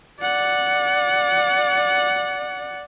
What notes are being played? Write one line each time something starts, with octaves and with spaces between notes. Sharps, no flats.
D5 F#5